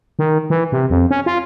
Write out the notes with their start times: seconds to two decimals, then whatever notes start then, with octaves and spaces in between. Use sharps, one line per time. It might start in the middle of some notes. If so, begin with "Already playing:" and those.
0.19 D#3
0.50 E3
0.72 C3
0.90 F2
1.10 C#4
1.26 F4